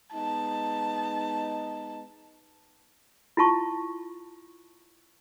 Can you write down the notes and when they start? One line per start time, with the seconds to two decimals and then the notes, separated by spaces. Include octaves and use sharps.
0.13 G#3 B3 D#4 A5
3.37 E4 F4 A5 C#6